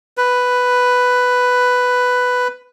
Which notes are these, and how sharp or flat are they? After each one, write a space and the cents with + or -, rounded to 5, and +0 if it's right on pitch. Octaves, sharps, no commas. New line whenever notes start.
B4 +5